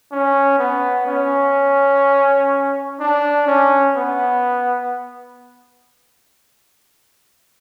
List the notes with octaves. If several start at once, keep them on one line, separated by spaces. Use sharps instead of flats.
C#4
B3
C#4
D4
C#4
B3